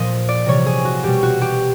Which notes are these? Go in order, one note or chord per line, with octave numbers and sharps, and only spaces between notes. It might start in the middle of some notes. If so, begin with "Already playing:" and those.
Already playing: A#2 F3 D#5
D5
C3 E3 G3 C#5
G#4
F#4
B2 G3 G4
F#4
G4